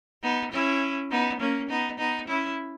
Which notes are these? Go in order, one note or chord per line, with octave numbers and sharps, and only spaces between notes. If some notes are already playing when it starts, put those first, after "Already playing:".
B3 D#4
C#4 E4
B3 D#4
A#3 C#4
B3 D#4
B3 D#4
C#4 E4